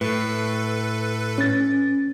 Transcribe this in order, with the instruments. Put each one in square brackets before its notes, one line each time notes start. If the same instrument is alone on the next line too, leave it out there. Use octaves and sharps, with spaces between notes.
[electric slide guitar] A2 [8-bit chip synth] A4 B4
[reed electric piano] C#4 A6